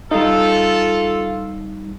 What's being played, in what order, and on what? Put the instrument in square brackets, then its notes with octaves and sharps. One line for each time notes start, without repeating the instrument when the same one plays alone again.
[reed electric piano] G3 D#4 [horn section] F4 A4